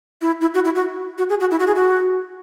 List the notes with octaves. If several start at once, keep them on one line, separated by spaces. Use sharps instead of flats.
E4
E4
F#4
E4
F#4
F#4
G#4
F#4
E4
F#4
G#4
F#4